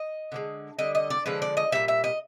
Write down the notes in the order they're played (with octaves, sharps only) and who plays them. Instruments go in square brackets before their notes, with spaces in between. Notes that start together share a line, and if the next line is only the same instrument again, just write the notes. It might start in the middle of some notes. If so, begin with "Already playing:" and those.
Already playing: [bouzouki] D#5
D3 F3 G#3
D3 G3 D#5
D#5
D5
D3 F3 G#3 B4
D5
D#5
A#2 G3 E5
E5
D#5